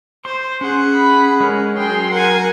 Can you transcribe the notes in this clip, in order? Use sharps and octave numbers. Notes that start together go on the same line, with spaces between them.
C5 C6
C#4 G#4 F#5
B5
G#3 C#4 A#4
F#3 G#4 G5 C6
A#4 F#5 G#5